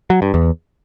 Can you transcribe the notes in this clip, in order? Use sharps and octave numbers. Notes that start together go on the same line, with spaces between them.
F#3
G2
E2